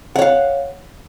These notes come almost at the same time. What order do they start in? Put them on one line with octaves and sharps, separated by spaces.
F#5 C#5 F5